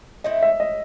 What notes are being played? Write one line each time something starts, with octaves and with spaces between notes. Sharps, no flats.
A3 C4 E4 D#5
E5
D#5